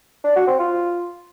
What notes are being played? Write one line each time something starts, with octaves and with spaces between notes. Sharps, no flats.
D4
F#4
C4
F4